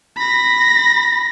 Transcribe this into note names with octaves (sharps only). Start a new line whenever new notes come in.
B5 A#6